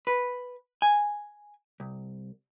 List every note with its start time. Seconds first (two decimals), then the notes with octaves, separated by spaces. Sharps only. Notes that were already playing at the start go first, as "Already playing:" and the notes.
0.07 B4
0.82 G#5
1.80 C2